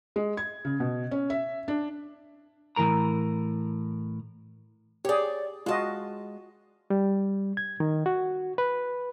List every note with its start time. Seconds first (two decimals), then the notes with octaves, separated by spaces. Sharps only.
0.16 G#3
0.37 G#6
0.65 C#3
0.80 B2
1.11 C#4
1.30 E5
1.68 D4
2.76 A2 E3 F3 A#4 A#5
5.05 G4 G#4 C#5 D5
5.66 G#3 F4 F#4 D#5 A5
6.90 G3
7.57 G#6
7.80 D#3
8.06 F#4
8.58 B4